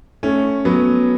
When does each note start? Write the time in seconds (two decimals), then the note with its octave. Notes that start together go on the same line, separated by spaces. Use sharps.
0.23 A3 C#4
0.65 F#3 B3